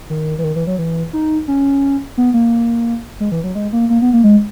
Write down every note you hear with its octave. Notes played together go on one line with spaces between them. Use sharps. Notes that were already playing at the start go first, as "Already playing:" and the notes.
D#3
E3
D#3
E3
F#3
E3
D#4
C#4
B3
A#3
G#3
E3
F#3
G#3
A#3
A#3
B3
A#3
G#3